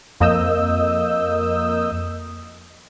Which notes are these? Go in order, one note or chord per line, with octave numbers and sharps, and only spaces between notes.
F2 A#3 D#5 D#6 E6 G6